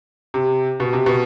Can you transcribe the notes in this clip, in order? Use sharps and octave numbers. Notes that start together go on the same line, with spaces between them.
C3
B2
C3
B2